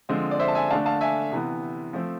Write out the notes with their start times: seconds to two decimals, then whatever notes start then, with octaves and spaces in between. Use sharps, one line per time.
0.09 D3 F3 G#3 C4
0.31 D5
0.39 C5 E5
0.48 A5
0.55 E5 G#5
0.70 D3 A3 D4 F5 A5
0.86 F5 A5
1.01 E5 G#5
1.32 C3 E3 B3
1.93 F3 A3 C4